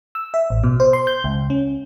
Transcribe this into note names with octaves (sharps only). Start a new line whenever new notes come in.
E6
E5
A1
B2
C5
C6
G6
C#2
C#4